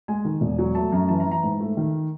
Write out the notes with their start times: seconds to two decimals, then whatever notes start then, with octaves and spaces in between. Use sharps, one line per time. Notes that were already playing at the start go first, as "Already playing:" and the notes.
0.08 G#3 G#5
0.25 D#3
0.41 E1
0.59 F#3
0.75 A3 A5
0.92 F#2 A#5
1.09 E3 A5
1.20 A#5
1.26 E3
1.31 A#5
1.43 G#2
1.60 A3
1.77 D#3